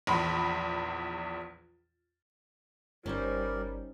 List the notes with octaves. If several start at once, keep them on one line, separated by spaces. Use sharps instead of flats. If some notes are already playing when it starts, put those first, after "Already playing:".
A#1 E2 B5 C6
G1 G3 C#4 D#4 A#4 C5 D5